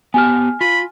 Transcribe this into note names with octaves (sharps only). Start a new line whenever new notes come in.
B3 G4 G#5 A5 F6
F4 B5